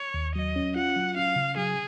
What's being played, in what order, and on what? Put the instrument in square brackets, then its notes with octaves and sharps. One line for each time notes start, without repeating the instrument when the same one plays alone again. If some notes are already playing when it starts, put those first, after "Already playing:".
Already playing: [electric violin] C#5
[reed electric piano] D#2
[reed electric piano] F#3 [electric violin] D#5
[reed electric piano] C#4
[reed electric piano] F4 [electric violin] F#5
[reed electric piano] F#3
[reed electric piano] C#4 [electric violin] F5
[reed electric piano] C#3
[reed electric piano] F#3 [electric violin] G#4